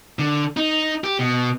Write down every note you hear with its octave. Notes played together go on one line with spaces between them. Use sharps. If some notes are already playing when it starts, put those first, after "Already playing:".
D3
D#4
G4
B2